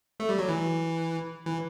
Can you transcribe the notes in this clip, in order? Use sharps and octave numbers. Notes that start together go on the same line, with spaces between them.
A3
G3
F#3
E3
E3